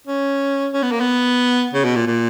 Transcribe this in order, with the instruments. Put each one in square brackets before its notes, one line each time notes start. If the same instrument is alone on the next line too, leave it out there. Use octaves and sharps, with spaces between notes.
[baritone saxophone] C#4
C#4
B3
A#3
B3
C#3
B2
A#2
A#2